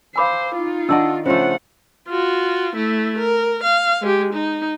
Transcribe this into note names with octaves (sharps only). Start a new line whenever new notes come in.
C5 F5 G#5 B5 D6 E6
D#4 F4
D#3 D4 D5 D#5 F#5 A5 E6
C#3 F3 A3 F4 C5 C#5 F#5
F4 F#4
A3 E4
A#4
F5
G#3 G4
D#4